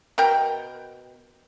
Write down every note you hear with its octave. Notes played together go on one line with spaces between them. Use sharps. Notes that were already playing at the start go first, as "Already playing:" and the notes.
B2 A#4 G5